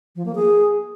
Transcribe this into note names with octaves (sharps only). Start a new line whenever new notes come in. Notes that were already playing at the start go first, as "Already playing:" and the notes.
F3
A#3
G#4